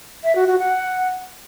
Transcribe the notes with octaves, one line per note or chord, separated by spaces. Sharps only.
E5
F#4
F#4
F#5